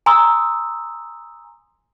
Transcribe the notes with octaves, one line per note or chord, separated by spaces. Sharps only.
G#5 A#5 C6 D#6 E6